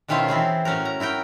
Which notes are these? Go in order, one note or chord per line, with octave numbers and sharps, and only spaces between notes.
B2 D#3 C#4 E4 F4 C5
E3 C4 E4 G#4
A2 C#4 F#4 A#4
A#5
E4 F#4 A#4 G5